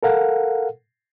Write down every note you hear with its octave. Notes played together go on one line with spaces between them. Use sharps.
A4 A#4 F5 F#5